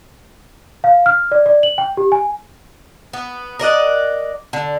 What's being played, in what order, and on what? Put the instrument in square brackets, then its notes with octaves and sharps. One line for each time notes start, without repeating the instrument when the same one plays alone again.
[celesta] F5
F6
D5
D5
F#7
G5
G4
G#5
[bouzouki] B3
A#4 D5 D#5 F#5
D3